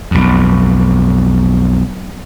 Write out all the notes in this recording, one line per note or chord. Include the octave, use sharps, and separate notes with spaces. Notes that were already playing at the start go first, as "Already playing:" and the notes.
B1 F2